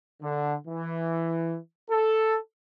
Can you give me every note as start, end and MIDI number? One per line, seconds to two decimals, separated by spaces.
0.22 0.55 50
0.67 1.57 52
1.90 2.37 69